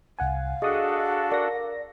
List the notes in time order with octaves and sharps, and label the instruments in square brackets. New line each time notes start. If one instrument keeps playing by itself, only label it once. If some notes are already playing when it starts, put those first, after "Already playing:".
[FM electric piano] C2 F#5 G#5 [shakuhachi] F5
[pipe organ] D4 F#4 A4 [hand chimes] G#4 [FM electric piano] D#5 D#6
[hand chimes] A#4 [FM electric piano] D5 A#6